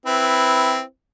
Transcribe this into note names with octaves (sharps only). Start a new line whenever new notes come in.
C4 E4 B4